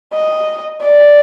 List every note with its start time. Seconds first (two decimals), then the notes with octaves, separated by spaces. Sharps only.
0.13 D#5
0.81 D5